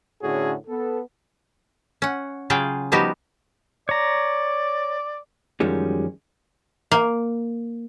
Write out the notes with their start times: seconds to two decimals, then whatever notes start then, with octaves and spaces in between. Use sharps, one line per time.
0.22 A2 D3 C#4 F#4 G#4
0.67 B3 A4
2.02 C#4 F#5
2.50 C#3 F#3 F4 G#4 F5 G5
2.92 F3 G3 B3 D#4 F#4 G4
3.89 C#5 D5 A#5
5.60 F#2 D#3 F3 G3 G#3 C#4
6.92 A#3